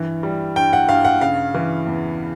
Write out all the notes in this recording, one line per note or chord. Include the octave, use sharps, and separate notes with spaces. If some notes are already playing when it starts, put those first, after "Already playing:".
Already playing: G2 E3
G3
G2 G5
F#5
G2 F5
F#5
C#3 F5
E3
E2